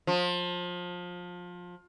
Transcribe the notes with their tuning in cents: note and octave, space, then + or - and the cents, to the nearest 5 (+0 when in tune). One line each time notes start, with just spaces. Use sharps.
F3 +25